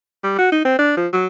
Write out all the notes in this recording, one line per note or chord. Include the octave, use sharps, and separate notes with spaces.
G3
F#4
D#4
C4
D4
F3
F#3